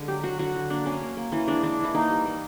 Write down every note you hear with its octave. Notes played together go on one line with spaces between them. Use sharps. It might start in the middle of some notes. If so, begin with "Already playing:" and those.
Already playing: D3 G#3
F#3 G4
F#3 F#4
D3 F#4
D3
A#3 D4
A#3 C#4
A#3
A#3
E3 C#4
G#3 D4
E3 D4
E3
E4
A#3 D#4
G3
A#3